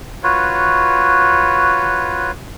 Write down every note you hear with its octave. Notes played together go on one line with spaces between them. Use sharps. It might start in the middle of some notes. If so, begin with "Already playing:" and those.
F4 F#4 B4 C#5